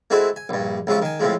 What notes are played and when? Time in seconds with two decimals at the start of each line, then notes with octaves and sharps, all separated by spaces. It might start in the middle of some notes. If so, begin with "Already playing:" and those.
0.10 G#3 A3 C4 E4 F#4
0.36 G#5
0.49 A#1 G2
0.87 C#2 C3 F3 F4 C#6
1.02 D#3 G#5
1.20 A2 C3 F3 G#3